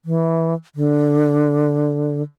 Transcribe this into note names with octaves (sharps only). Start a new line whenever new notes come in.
E3
D3